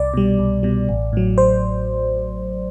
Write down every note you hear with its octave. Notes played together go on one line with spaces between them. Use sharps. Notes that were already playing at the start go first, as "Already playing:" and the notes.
Already playing: C2 D5
B2 G3
C2
B2 G3
A1
A2 F#3
C5